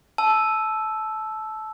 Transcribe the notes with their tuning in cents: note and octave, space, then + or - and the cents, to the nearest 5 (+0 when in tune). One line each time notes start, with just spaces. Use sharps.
A5 -20 E6 +0